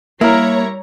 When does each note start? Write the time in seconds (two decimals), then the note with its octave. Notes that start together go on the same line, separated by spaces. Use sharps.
0.21 G3 A#3 E4 A#4 C#5 A#5